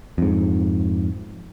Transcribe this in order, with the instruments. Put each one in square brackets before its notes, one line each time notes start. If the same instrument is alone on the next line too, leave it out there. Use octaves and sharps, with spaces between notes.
[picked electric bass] F2 G#2